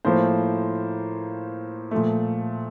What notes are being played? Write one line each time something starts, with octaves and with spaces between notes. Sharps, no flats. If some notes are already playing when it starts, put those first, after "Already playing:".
A2 F3 A#3 C5
A#2 F3 A3